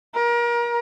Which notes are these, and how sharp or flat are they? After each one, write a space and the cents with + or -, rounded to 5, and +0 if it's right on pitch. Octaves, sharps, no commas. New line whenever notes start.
A#4 +30